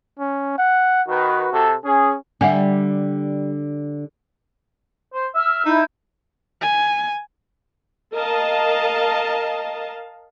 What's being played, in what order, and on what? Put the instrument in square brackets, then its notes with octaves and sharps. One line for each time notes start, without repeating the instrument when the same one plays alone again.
[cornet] C#4
F#5
[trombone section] D#3 B4 [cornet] F#4
[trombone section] C3 A4
[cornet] C#4 [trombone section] G#4
[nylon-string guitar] D3 [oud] G3 [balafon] E5 F#5 G#5
[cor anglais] C5
[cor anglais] E5 [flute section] E6 F6
[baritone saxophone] D#4 [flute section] E4 G6
[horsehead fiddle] G#5
[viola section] A#4 D#5 F5 A5